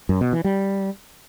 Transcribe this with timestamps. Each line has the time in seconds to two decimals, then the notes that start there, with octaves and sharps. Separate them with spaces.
0.09 F#2
0.21 B2
0.33 E3
0.44 G3